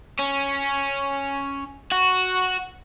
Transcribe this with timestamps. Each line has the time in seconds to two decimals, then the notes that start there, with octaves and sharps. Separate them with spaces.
0.19 C#4
1.92 F#4